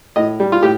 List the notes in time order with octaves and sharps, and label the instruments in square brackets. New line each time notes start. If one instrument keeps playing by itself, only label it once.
[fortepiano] A2 D#5
G3
F4
A2 G4